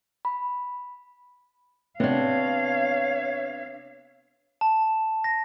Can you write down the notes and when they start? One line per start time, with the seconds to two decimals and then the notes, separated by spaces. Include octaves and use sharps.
0.25 B5
2.00 C3 B3 D4 C#5 F5
4.61 A5
5.24 A#6